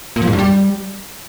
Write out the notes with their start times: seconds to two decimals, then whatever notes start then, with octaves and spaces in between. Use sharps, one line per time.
0.16 A#2
0.22 F3
0.27 G#2
0.33 G2
0.39 G3